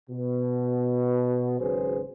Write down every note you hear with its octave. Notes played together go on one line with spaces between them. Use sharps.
B2
G#1 C#3 F#3 G#4 B4 C5